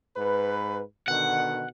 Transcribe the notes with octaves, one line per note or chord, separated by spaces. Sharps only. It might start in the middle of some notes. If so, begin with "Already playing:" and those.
G#2 B4
B2 D3 D#3 F#5